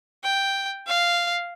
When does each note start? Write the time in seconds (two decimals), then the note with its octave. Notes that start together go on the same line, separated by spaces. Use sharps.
0.24 G5
0.86 F5